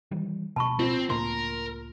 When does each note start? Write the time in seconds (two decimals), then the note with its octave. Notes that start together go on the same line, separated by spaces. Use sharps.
0.11 D#3 E3 G3
0.56 D1 B2 A5 B5 C#6
0.79 C4 F4
1.10 C#2 A2 A#3 A#4 C6